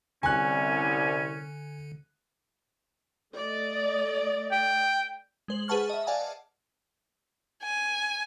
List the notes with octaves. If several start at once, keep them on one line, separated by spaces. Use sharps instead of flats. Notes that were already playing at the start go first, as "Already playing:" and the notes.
C2 D3 C#4 G#5 F#6
A3 D5 D#5
G5
G#3 C5 F#7
G#4 B4 F#5 A5 C#6 F6
D#5 E5
D5 F5 F#5 G#5 A5
G#5